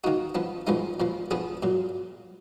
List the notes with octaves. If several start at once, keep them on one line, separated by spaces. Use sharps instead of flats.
D#3 A#3 D#4 F#4
F3 B3 D4
A#2 F3 G#3 B3 D#4
A#2 F3 A#3
F3 B3 D4 G#4
A#2 F#3